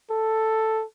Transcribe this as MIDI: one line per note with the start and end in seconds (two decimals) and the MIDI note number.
0.10 0.84 69